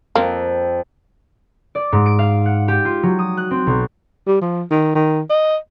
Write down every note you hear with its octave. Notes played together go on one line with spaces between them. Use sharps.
F2 A#3 C4
D5
G#2
D7
F5
F#5
G4
F4
F#3
D#6
F#6
C4
B1
G3
F3
D#3
D#3
D#5